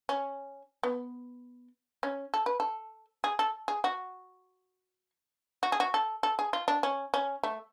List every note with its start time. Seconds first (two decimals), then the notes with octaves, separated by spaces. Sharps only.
0.09 C#4
0.83 B3
2.03 C#4
2.34 A4
2.46 B4
2.60 A4
3.24 G#4
3.39 A4
3.68 G#4
3.84 F#4
5.63 F#4
5.72 G#4
5.80 F#4
5.94 A4
6.23 A4
6.39 G#4
6.53 F4
6.68 D4
6.83 C#4
7.14 C#4
7.43 A3